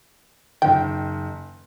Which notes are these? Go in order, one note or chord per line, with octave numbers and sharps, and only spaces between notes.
F#1 D#3 G5